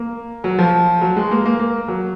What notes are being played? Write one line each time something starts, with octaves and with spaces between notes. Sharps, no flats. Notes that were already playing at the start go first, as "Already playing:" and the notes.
Already playing: A#3
F#3
F3
F#3
G#3
A#3
A#3
A#3
F#3